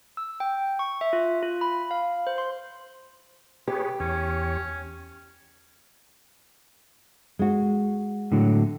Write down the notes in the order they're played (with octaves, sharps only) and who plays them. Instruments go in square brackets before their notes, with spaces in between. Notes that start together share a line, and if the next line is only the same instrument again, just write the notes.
[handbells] E6
G5
C#6
E5
F4
F4
B5
F5
C5
C6
[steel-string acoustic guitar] G4 [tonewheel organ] G#4 B4 C#5
[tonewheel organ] E2 C#5 [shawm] C#4
[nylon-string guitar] G#3 F#4
[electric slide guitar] A2 D3 F#3